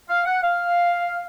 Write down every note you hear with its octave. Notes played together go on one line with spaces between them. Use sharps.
F5
F#5
F5